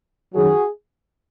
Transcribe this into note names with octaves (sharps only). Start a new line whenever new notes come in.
F#2 D#3 F#3 F#4 G#4